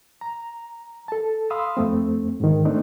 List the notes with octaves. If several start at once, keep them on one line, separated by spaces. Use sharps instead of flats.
A#5
A4 A5
F5 B5 C6 D#6 E6
F2 A3 C4
G#2 D#3
A3 C4 D4 D#4